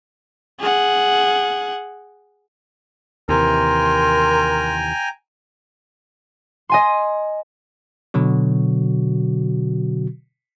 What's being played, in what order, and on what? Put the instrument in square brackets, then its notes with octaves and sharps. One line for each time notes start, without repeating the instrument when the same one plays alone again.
[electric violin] G#4 F#5
[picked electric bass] D#2 C3 E3 [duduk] A#4 [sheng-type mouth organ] G5 G#5 A#5 [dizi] C6
[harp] D#5 G#5 C6
[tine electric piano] B2 D3 F#3 F#4